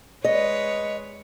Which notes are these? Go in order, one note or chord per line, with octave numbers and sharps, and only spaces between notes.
G#3 B4 C#5 D#5